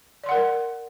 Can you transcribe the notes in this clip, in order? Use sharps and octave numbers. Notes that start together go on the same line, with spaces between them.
A#4 D5 F#5 C6